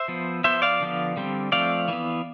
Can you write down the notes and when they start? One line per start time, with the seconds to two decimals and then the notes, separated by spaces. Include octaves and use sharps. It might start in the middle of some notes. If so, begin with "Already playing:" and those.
Already playing: C5 E5
0.08 F3 B3
0.44 F3 B3 C5 E5
0.62 D5 F5
0.80 D3 F3 B3
1.17 D3 G3 C4
1.52 F3 A3 C4 D5 F5
1.88 E3 B3